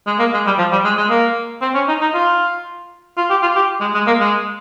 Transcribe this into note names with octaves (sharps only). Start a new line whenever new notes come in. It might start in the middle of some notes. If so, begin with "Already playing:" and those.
G#3
A#3
G#3
G3
F3
G3
G#3
G#3
A#3
C4
C#4
D#4
D#4
F4
F4
G4
F4
G4
G#3
G#3
A#3
G#3